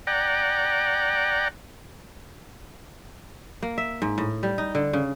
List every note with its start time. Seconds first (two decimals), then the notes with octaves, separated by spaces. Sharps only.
0.07 D5 F#5 G5 A#5
3.63 A#3
3.78 E5
4.02 G#2
4.18 A2
4.43 G3
4.58 D#4
4.75 D3
4.93 C#3